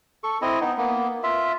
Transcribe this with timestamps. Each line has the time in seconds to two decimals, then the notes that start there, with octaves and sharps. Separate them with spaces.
0.24 A4 C#6
0.42 C4 E4 D#5
0.61 B3 D#4
0.78 A#3 B3
1.23 F4 E5